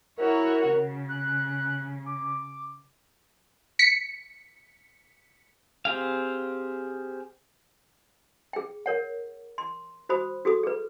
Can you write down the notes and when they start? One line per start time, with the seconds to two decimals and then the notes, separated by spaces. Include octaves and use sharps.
0.18 E4 F#4 A#4 C#5
0.69 C#3
1.09 F#6
2.06 D6
3.79 B6 C#7
5.85 C4 G4 G#4 F5
8.53 G#4 G5
8.86 A#4 C#5 F#5
9.58 C6
10.09 F#4 C5 B5 D#6
10.45 F#4 G#4 A4 D#6
10.63 G#4 B4